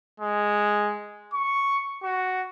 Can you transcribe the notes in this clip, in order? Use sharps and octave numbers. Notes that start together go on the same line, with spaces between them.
G#3
C#6
F#4